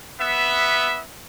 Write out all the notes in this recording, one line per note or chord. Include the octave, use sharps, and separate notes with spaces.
B3 E5